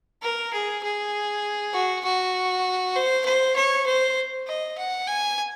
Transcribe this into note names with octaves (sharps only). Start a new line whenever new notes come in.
A#4
G#4
G#4
F#4
F#4
C5
C5
C#5
C5
D#5
F#5
G#5